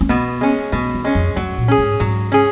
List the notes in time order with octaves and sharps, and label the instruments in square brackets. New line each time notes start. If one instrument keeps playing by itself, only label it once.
[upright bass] C#4
[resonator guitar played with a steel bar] B2 [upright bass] B3
[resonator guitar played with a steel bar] G#3 C#4
[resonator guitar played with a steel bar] B2 [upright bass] F#3
[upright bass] D#3
[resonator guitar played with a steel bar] G#3 C#4
[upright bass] F2
[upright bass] F#2 [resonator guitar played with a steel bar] F#3
[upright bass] A#2
[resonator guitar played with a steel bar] C#4 G#4
[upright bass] G#2
[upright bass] G#2 [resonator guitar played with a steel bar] F#3
[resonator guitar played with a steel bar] C#4 G#4